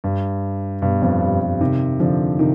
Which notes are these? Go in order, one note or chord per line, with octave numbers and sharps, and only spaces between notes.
G2
G2 B2
F2
G2
G2
C3 D#3
D3 F3
C3 D#3